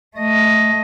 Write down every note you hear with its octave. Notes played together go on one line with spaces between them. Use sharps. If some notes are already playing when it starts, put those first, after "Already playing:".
A3 D#5